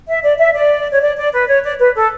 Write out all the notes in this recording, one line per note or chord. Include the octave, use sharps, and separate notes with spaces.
E5
D5
E5
D5
C#5
D5
D5
B4
C#5
D5
B4
A4